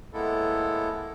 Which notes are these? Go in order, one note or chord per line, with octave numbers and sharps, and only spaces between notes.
A2 G#3 A#3 B3 E4 A4